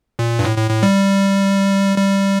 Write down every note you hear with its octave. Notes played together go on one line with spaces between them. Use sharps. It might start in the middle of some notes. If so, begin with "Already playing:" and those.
A#2
G2
A2
A2
A2
G3
G3